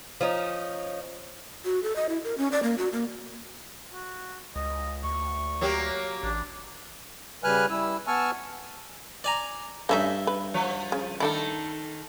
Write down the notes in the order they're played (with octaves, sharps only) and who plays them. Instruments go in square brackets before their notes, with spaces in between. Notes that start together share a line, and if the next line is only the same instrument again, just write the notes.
[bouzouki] F3 C#4 D#4
[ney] F#4
A4
D#5
E4
A#4
C#4
D5
A#3
F#4
A#3
[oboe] F#4
[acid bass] C#2 [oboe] D#5
[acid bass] D2 [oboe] C#6
[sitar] F#3 A#3 G4
[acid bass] A1 [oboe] D4
[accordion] C#3 G3 B4 G#5 F6 F#6
G3 E4 E6
B3 G#5 A5 C#6 E6 F6
[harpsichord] D5 G#5 A#5
[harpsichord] G2 E5 [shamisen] A3 C#4 D#4
[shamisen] B4
[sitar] F3
[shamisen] C#3
[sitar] D#3 A4 [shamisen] A3 D4 E4